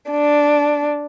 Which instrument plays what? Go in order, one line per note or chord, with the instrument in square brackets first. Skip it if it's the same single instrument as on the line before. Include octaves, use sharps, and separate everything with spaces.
[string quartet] D4